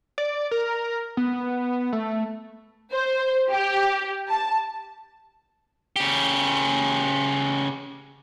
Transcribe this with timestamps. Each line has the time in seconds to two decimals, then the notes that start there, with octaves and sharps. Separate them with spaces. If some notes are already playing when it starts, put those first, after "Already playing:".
0.18 D5
0.51 A#4
1.17 B3
1.93 A3
2.92 C5
3.50 G4
4.29 A5
5.96 C#3 G4